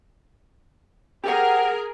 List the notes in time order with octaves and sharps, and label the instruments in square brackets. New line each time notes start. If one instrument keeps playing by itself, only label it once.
[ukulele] G4 C5 F#5 [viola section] G#4 A#4